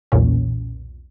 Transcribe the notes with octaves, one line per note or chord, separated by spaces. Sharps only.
B1 E2 A#2 C#4